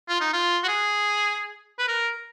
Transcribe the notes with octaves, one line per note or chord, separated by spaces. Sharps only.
F4
D#4
F4
F#4
G#4
B4
A#4